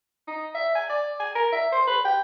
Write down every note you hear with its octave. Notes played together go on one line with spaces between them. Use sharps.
D#4
E5
G#5
D5
G#5
A#4
E5
C5
B4
G5